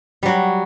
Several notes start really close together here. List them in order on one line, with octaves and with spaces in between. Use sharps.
G3 F#3 F#4